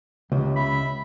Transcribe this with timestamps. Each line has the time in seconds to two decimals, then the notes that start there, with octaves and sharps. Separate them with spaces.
0.32 C#2 C3
0.56 E5 B5